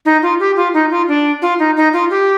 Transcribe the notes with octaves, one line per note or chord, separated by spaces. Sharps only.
D#4
F4
G4
F4
D#4
F4
D4
F4
D#4
D#4
F4
G4